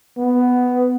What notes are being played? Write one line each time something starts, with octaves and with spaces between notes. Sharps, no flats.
B3